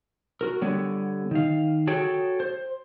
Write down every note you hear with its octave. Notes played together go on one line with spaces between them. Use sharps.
F#4 A#4
D3 G3 B3 C#5
D#3 F5
F#4 G#4 A4 C#5 G5
C5